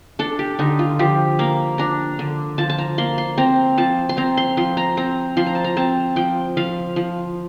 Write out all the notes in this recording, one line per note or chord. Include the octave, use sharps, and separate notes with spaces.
D4 A4
G4
D3 D#4
F4
F3 G4
A#3 F5
D4 A#5
D3
F3 A5
A5
A#5
A#3 C6
C6
C4 A#5
F3 A5
C6
C4 A#5
C6
F3 C6
A#5
C4 A#5
F3 C6
A#5
A5
A#5
C4 A5
F3 G5
F3 F5
F3